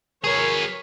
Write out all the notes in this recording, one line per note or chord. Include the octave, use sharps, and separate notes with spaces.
F#3 G#4 A#4 B4 C#5